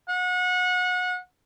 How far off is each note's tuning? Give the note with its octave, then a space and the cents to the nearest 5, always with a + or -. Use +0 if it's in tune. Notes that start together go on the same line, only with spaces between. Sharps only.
F#5 -30